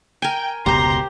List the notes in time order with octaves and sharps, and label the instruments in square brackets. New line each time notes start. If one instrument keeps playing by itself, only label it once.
[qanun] A#4 G#5 [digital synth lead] G5
[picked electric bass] F1 C#2 B2 [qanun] G4 C5 [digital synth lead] A#5 [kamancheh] C6